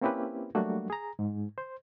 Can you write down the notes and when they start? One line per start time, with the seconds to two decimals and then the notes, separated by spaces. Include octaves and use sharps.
0.01 A#3 C4 C#4 E4 G4 B4
0.55 F#3 G3 A3 A#3 D4 F#4
0.90 G#4 A#5
1.19 G#2
1.58 C5